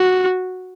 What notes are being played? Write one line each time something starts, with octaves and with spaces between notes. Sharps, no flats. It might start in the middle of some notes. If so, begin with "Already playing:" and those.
Already playing: F#4